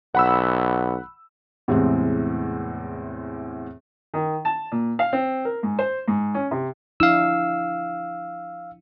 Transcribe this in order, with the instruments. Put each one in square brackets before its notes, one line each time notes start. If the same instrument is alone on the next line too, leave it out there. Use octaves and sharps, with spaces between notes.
[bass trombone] B1 [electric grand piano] F#5 B5 E6
[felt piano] E2 A2 C3 G#3 C4
[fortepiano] D#3
A5
A#2
F5
C4
A#4
G#2
C5
G#2
C#4
C3
[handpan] F3 D4 E4 [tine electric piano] F5 E6